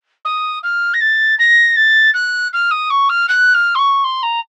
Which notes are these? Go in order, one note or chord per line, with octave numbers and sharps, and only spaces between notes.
D#6
F6
A#6
A6
A#6
A6
F#6
F6
D#6
C#6
F6
F#6
F6
C6
C#6
C6
A#5